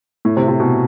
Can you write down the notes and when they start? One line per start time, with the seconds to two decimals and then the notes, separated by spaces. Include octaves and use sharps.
0.25 A2
0.37 C3
0.48 C3
0.60 B2